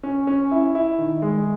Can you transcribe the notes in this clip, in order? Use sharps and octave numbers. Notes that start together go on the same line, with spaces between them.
C#4
C#4
E4
E4
D#3
G#3